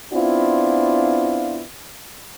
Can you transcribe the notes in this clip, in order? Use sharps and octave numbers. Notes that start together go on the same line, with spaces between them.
B3 C4 D4 E4 F4